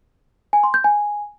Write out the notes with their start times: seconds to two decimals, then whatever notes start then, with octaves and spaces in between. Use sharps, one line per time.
0.53 G#5
0.63 C6
0.74 G6
0.84 G#5